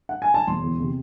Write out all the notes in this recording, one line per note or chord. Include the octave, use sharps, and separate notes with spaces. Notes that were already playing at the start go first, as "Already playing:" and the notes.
F#5
G#5
A5
E1 C6
E2
C3